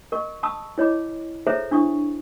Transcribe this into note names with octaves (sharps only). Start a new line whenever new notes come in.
A#4 D#5 C#6
A5 B5 C#6 D#6 E6
E4 C#5 D#5 B5 D6
G#4 A4 C5 C#5 E5 A#5
D4 E4 C#6 D#6